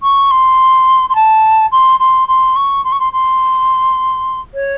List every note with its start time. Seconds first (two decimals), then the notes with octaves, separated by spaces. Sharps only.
0.03 C#6
0.31 C6
1.09 C6
1.15 A5
1.72 C6
1.99 C6
2.28 C6
2.56 C#6
2.84 C6
2.92 C#6
3.00 C6
3.13 C6
4.54 C#5